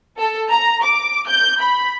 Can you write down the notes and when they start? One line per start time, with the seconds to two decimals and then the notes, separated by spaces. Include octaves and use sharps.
0.17 A4
0.50 A#5
0.82 D6
1.27 G6
1.61 B5